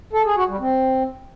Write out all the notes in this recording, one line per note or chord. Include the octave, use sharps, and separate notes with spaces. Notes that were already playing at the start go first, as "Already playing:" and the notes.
A4
G#4
F#4
G3
C4